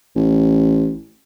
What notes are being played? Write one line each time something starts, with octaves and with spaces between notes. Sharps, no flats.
A1